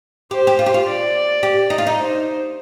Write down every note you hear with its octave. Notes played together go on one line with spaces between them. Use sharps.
G4 C5
G4
F4
G4
F4
D5
G4
D#4
F4
D#4
C5